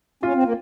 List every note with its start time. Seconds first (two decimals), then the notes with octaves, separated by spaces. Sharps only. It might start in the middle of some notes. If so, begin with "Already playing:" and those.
0.23 C#4 F4
0.34 C4
0.43 A#3